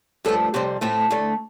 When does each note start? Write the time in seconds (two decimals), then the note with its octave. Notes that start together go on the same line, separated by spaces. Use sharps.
0.25 G2 F3 A3 A4
0.54 F2 C3 G3 C4 C5
0.81 A2 A3 C4 A4
1.11 D2 D3 A3